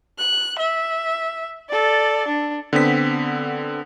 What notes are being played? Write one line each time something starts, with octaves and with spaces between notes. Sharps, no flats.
F#6
E5
A4 D5
D4
D3 B3 C4 B6